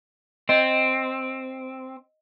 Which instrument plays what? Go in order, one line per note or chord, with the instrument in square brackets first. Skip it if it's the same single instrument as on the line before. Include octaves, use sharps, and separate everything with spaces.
[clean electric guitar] C4 [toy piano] D#5